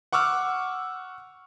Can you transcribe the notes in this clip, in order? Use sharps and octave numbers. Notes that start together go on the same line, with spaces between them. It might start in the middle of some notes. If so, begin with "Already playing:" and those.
F#5 C#6 D6 E6 F6